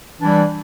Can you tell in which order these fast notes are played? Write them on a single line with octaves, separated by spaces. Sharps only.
E3 D4 G3